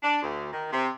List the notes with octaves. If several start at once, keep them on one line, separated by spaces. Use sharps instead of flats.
D4
D2
D#3
C3